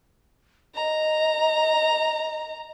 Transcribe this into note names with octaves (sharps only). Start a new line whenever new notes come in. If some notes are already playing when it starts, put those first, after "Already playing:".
D#5 A#5